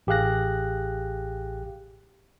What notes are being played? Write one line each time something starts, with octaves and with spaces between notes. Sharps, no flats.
A1 G4 G#4 F5 F#6 A#6